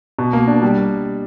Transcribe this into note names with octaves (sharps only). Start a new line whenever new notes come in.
B2
A#3
D4
G3